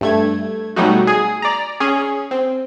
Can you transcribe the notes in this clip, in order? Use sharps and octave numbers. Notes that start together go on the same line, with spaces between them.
G2 A3 G#6
B2 F#3 G3 A3 D#4 F#4
G#4
D5 A#5
C#4 G#4
C4